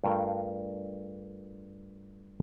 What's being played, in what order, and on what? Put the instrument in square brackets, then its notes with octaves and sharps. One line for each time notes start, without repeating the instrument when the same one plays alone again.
[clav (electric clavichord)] G2 A3 F4 A#4 F5 G5